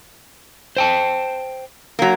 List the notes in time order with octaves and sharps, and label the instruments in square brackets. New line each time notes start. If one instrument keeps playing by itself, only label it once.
[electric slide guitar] C5 G5 A5
[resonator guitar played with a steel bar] F#3 A#3